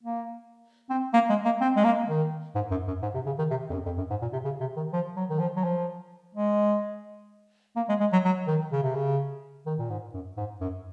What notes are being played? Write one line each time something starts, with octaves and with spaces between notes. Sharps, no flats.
A#3
C4
A#3
G#3
A#3
C4
G#3
A#3
D#3
G#2
F#2
F#2
G#2
C3
C#3
D#3
C3
F2
F#2
F2
F#2
G#2
A#2
C3
C#3
C3
D#3
F3
F#3
D#3
F3
F#3
F3
G#3
A#3
G#3
G#3
F#3
F#3
D#3
C#3
C3
C#3
D#3
A#2
G#2
F#2
G#2
F#2